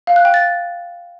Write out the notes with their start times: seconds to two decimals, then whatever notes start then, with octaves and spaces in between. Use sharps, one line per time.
0.07 F5
0.16 F#6
0.25 G5
0.34 A6